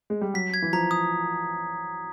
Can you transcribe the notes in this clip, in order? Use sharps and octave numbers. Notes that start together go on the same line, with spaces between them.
G#3
G3
F#3 B6
G#6
E3
F3 A#5
D#6